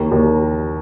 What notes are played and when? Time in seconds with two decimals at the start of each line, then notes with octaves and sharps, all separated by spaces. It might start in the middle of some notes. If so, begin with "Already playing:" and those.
Already playing: D#2 A#5
0.12 D#2